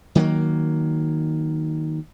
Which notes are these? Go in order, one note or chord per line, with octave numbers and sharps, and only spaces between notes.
D#3 F#3 G#3 A#3